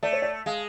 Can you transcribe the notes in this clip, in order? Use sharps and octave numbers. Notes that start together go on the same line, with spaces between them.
A3 D5
C#5
D5
G#3 F5